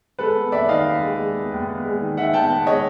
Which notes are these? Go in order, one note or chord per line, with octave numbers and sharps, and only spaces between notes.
G#3 A4 B4
B3
D#2 D5 E5
D#3 D#5 F5
D#2
G#3
G#3
B3
D#2
B3
G#3
D#3
D#3 E5 F#5
B3 G5 A5
B3
G#3 C#5 D#5